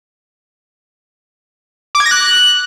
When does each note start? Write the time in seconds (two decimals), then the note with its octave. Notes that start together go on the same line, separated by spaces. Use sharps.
1.95 D6
2.00 G#6
2.06 A#6
2.11 F#6